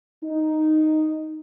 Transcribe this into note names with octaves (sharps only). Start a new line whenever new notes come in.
D#4